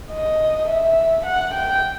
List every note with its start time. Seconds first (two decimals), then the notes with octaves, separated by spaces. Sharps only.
0.12 D#5
0.69 E5
1.26 F#5
1.54 G5